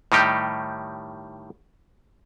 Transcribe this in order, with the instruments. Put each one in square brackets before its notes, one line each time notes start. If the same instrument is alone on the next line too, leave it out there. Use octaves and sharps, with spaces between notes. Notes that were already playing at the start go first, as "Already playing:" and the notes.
[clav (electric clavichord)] A2 D#3 G3 D#4 G4